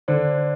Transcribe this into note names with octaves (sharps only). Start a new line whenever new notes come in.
D3 C5 D5